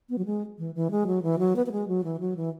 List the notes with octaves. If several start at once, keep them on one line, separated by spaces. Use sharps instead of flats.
B3
F#3
G#3
E3
E3
G#3
F#3
E3
F#3
B3
B3
G#3
F#3
E3
F#3
E3